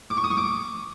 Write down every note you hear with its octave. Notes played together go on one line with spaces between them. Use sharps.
D6
C#6
D#6
C#6
D6